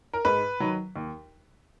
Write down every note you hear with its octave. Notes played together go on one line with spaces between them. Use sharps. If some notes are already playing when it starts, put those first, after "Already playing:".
A#4
G#2 B4
D#3 F#3
D#2